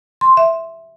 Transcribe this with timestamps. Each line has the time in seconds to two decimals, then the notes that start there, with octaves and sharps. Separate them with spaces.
0.21 C6
0.37 E5